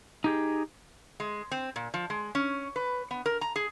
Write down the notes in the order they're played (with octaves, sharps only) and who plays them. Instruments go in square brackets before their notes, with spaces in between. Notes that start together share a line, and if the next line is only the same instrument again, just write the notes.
[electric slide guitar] D#4 G4 G#4
[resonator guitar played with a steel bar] G#3
C4
A#2
F3
G#3
C#4
B4
B3
A#4
A#5
G#4